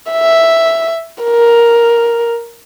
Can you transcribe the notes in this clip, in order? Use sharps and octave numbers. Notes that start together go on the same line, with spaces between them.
E5
A#4